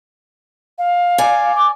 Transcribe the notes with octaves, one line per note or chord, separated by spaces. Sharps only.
F5
D5 G#5
D6